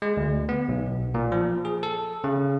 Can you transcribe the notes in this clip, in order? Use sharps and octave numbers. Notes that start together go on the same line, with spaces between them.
G#3
D2
B3
B1
A#2
F3
G#4
A4
C#3